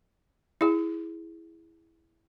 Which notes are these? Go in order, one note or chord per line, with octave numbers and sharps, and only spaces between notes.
E4 G#4